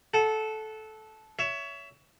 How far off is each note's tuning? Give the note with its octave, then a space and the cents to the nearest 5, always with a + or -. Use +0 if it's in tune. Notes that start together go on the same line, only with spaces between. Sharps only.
A4 -15 F#5 +0
C#5 +25 E5 +10